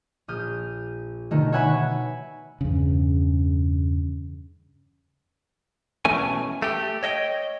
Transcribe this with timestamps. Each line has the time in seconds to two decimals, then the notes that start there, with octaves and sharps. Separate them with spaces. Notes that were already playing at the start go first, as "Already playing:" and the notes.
0.28 A#1 D#6 F6 G6
1.31 B2 D3 D#3 A3
1.52 C#5 E5 F#5 G#5 B5 C#6
2.61 E2 G2 C#3
6.05 B2 E3 A3 C#4 G#5
6.62 A3 G4
7.03 C#5 D#5 E5 G5